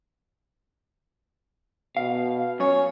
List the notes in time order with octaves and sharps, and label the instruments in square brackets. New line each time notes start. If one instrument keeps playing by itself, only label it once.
[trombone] B2 [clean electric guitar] F5
[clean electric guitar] F#2 [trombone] C#4 [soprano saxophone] C#5